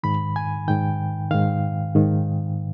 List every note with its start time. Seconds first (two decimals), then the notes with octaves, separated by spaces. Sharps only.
0.03 G#2 D#3 B5
0.36 G#5
0.68 G#2 D#3 G5
1.31 G#2 D#3 F5
1.95 G#2 D#3